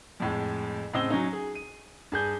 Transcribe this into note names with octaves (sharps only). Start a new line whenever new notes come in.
F2 A2 G#3
A2 C#3 C4 D#5 E6 G7
F#3 C#4 D#4
G#4
D#7
G2 G#4 G6